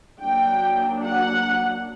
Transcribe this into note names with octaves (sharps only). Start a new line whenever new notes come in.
F#3 A#3 D4 G5
F#5